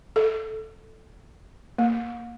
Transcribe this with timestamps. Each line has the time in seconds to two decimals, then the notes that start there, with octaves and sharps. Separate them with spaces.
0.16 A4
1.78 A#3